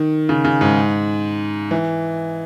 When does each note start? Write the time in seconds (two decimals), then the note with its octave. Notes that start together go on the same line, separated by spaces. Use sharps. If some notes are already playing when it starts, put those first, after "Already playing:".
Already playing: D#3
0.29 C#3
0.44 C#3
0.61 G#2
1.71 E3